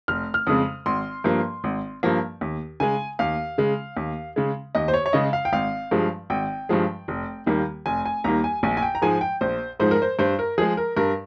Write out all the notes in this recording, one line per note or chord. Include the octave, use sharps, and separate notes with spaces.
F1 F6
F6
F2 C#3 G#3 D#6
G#1 C6
G2 F3 A#3
G#1
G2 F3 A#3
D#2
C#3 G#3 G#5
D#2 F5
C#3 G#3
D#2
C#3 G#3
D#2 D#5
C5
C#5
C#5
C#3 G#3 D#5
F5
G5
G#1 F5
G2 F3 G#3
G#1 G5
G2 F3 G#3
F1
D#2 D#3 G3 A#3
F1 G#5
G#5
D#2 D#3 G3 A#3 A#5
G#5
A#1 G#5
G#5
G5
A#5
G#2 F3 G#3 G#5
G5
A#1 C5
G#2 F3 G#3 C5
A#4
C5
G2 C5
A#4
F3 G#3 G#4
A#4
G2 A#4